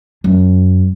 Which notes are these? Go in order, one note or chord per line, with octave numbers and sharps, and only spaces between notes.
F#2